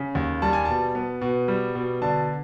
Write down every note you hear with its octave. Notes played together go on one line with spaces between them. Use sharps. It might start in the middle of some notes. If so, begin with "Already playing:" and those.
Already playing: C#3
D#2
G3 A5
G#5
B2 A5
B3
B2
G3
B2
D3 A5